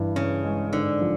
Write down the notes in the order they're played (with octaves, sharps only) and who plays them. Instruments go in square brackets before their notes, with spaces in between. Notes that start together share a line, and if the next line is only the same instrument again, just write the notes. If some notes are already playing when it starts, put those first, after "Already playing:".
Already playing: [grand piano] G2 E3
[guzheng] C#3 [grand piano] C#4
[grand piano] G#3
[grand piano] G#2 [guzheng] D3
[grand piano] F3